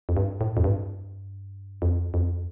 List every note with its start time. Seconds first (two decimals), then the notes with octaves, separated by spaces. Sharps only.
0.09 F2
0.17 G2
0.41 A2
0.57 F2
0.64 G2
1.82 F2
2.14 F2